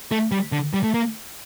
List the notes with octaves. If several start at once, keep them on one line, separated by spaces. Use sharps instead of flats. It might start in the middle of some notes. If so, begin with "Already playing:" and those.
A3
G3
D3
G3
A3
A#3